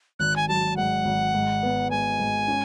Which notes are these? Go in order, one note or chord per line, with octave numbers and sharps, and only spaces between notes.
G#1 F#6
G#5
F#3 A5
G#2 F#5
G#1
G#2
B3
G#3 G#5
G#2
C#4